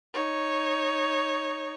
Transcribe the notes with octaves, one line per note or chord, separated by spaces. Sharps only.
D#4 C#5